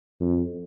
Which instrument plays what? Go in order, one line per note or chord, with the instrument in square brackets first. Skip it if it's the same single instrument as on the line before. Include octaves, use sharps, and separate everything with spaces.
[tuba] F2